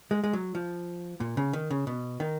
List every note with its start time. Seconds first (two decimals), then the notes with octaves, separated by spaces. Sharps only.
0.11 G#3
0.24 G#3
0.33 F#3
0.55 F3
1.20 A#2
1.37 C#3
1.53 D#3
1.70 C#3
1.87 B2
2.20 D#3